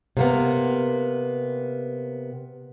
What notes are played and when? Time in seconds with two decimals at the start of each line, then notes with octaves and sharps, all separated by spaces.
0.17 C3 A#3 B3